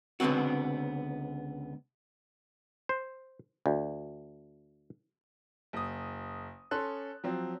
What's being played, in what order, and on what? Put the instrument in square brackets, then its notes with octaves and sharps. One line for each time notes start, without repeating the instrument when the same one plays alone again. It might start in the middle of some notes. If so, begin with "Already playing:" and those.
[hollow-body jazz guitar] C#2 D3 B3 C4 F#4
[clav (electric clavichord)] C5
D2
[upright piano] F#1 D#6
C#4 A4 C6 F#6
F3 F#3 C4